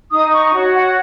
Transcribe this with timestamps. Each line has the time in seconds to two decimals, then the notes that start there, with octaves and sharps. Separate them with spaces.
0.12 D#4 D#6
0.33 C#6
0.54 F#4 C#5 F#5
0.75 F#5